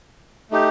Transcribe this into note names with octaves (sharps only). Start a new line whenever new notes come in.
A3 D#4 G4